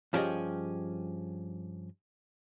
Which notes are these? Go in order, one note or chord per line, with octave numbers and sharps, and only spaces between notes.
G2 F3 C#4 G4 G#4 D#5